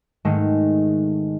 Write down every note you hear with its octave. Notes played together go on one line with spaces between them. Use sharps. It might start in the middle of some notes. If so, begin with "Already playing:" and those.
G#2 D#3 G#3 A3